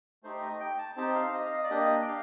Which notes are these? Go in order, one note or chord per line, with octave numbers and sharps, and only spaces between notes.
A3 D#4 G4 C5
D#5
G5
A5
C4 D#4 G4 A5
F5
D#5
F5
D#5
D5
A#3 D4 G4 D#5
G5
F5